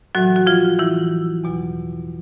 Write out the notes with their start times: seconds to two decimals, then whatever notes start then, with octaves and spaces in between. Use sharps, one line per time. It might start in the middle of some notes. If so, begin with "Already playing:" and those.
0.15 A2 E3 F#3 F#4
0.36 F#4
0.47 F3 F4
0.79 E3 E4
1.44 E2 B2 F#3